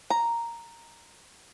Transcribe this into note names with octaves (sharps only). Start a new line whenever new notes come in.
A#5